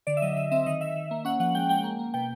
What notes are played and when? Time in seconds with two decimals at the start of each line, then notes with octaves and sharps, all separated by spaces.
0.07 D3 D5
0.17 E5
0.22 F#3 D#5
0.37 D3 E5
0.51 C4 E5
0.66 D#3 D#5
0.81 D#3 E5
0.96 D#3
1.11 A#3
1.25 C#4 F#5
1.40 F3 F#5
1.55 G#3 G5
1.69 G#3 G5
1.84 A#3
1.99 A#3
2.14 B2 G5